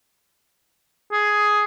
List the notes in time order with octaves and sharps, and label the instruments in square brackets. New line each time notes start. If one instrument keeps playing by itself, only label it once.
[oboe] G#4